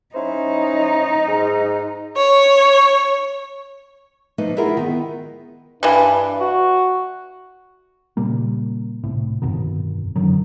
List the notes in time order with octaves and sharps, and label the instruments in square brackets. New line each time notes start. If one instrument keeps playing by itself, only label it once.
[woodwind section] C#4 E4 C5 [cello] D#4
[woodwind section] G#2
[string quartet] C#5
[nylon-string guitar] F3 A3 A#3 D#4 B4
E4 F4 G#4 A#4 E5 F#5
D#3 B3
[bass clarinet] G2 [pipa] E3 G3
[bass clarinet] F#4
[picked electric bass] A#2 C#3 G3 A#3
C2 A2
G1 F2 B2 D#3
F#2 D3 D#3 F#3